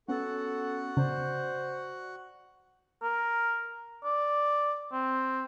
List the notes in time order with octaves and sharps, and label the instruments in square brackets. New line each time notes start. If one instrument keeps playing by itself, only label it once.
[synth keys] B3 C#4 [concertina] F#4 F#5 [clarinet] A4
[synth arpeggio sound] C#3 [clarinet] C5 [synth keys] D5
[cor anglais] A#4
D5
C4